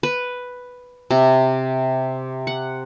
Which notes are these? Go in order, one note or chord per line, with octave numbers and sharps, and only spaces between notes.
B4
C3
F#5